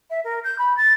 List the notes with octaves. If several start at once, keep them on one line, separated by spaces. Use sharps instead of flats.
E5
A#4
G6
B5
A6